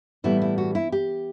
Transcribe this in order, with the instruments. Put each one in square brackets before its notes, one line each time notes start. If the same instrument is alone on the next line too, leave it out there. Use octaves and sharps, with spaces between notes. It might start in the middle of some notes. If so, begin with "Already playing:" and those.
[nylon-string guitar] A2 E3 G3 B3 E4
E4
F#4
E4
G4